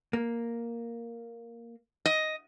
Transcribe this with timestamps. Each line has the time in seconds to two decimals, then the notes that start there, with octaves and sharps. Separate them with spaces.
0.13 A#3
2.06 D#5